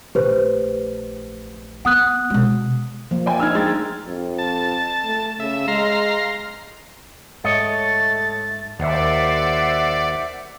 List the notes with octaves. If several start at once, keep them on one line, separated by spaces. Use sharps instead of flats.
A#1 A3 G4 B4 C5
B3 F#5 D#6 F#6
B2 G#3
F3 A#3
D5 G5 G#5
D4 D#4 E6 F6 G#6
G#3 G5 A6
F2
A5
A3
C#3 E5
G#3 F5 A#5 C6
G#2 A3 C#5 D#5 A6
D#2 C5 D5 E5 F#5